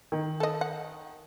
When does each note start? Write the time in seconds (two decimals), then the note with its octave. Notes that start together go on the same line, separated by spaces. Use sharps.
0.12 D#3
0.40 A4 D#5
0.61 F#5